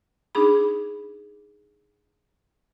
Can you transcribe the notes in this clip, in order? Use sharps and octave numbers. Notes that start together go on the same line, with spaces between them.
D4 D#4 G#4 B5